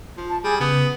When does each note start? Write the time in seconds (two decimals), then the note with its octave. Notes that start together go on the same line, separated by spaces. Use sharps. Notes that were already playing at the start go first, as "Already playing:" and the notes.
0.17 F3
0.30 A5
0.44 G3 G#4
0.60 C#3 B3 D#6